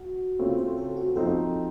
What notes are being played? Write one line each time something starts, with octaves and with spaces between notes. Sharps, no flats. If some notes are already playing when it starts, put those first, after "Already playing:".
Already playing: F#4
C#3 A3 C4 F4 C#5
C5
A4
F#4
F3 C4 D#4 F#4 A4